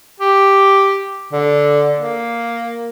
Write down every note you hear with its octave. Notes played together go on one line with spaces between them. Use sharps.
G4
D3
A#3